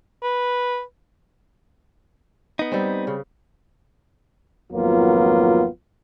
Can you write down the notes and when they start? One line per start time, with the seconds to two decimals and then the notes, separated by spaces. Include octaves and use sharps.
0.23 B4
2.59 B3 D#4
2.72 G3 C4
3.07 C#3
4.72 G#1 F2 F#3 A#3 B3 F4